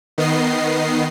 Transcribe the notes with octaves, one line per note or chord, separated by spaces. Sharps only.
D#3 B3 D#5 C7